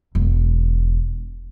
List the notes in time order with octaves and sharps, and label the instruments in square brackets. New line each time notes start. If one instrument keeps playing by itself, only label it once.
[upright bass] E1